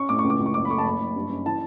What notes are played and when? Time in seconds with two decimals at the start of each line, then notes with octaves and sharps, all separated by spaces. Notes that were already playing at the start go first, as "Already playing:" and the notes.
Already playing: C#4 C#6
0.09 A2 D6
0.19 C#6
0.24 C#2
0.30 D6
0.40 C#2
0.46 C#6
0.54 F#1 D6
0.65 B5
0.70 A3 C#6
0.78 A5
0.84 F#1 B5
1.00 F#1
1.16 G2
1.30 C#4
1.46 E3 A5